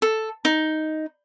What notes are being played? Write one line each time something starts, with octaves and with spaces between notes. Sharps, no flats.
A4
D#4